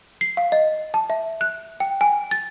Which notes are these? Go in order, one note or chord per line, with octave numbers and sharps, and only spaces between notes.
C7
F5
D#5
A5
E5
F#6
G5
G#5
A6